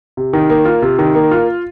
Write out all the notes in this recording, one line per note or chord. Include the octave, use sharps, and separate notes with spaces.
C3
D#3
A#3
F4
C3
D#3
A#3
F4